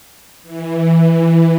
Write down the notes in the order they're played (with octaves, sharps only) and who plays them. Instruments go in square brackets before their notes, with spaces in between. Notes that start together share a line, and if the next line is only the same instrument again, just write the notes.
[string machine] E3